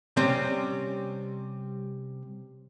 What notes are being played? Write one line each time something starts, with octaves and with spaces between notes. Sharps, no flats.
C3 G3 C4 C#4